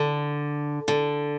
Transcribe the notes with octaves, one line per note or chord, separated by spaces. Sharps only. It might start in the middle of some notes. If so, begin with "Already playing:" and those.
Already playing: D3
D3